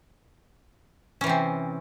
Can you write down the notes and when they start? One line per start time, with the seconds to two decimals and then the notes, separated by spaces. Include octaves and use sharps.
1.21 C#4
1.24 E3
1.27 C3
1.29 C4